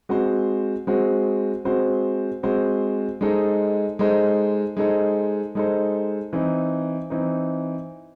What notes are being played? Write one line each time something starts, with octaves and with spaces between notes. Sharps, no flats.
G#3 C4 F#4 C5
G#3 C4 F#4 C5
G#3 C4 F#4 C5
G#3 C4 F#4 C5
G#3 D#4 A4 C5
G#3 D#4 A4 C5
G#3 D#4 A4 C5
G#3 D#4 A4 C5
E3 C4 D#4
E3 C4 D#4